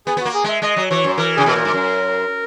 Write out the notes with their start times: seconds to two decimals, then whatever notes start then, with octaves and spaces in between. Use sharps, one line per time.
0.07 B3 G#4
0.17 B3
0.20 F#4
0.25 A#3
0.34 G#4
0.44 G#3 E5
0.62 G#3 D#5
0.76 F#3
0.91 E3 C#5
1.04 F#2
1.18 E3 A#4
1.36 C#3 G#4
1.46 B2 A#4
1.56 A#2
1.65 G#2
1.73 F#2